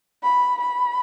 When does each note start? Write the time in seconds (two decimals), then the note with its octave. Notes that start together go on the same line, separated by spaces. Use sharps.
0.23 B5
0.61 B5